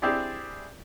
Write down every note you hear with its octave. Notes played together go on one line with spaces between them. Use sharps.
C4 D4 E4 G4 G#4 D5